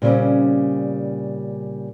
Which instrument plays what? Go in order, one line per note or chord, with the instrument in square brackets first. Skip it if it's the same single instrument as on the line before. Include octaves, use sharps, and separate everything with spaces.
[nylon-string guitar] A#2 C#3 G3 C4 C#4